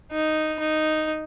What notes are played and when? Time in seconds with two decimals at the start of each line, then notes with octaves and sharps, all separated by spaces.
0.12 D#4
0.59 D#4